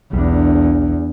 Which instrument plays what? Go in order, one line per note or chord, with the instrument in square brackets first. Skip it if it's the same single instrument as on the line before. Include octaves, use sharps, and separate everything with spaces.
[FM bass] B1 [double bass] E2 [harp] G3 D4